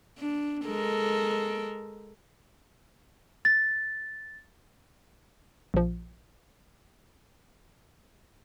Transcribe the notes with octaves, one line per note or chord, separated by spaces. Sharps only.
D4
G#3 A4 A#4
A6
A#1 F3